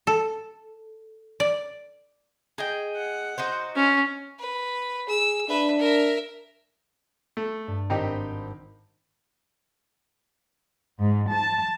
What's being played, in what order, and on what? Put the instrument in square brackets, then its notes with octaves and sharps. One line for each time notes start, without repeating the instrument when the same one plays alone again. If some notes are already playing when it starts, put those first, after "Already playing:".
[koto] A4
D5
[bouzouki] G#4 D#5 G5
[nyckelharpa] F#5
[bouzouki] D#4 F#4 C5
[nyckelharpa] C#4
[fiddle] B4
[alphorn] G#4 [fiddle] E6
[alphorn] D4 [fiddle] B4 E5
[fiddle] A#4 E5
[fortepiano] A3
[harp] G2
[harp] G#1 B5 [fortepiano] C4 D#4 G4
[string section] G#2
A5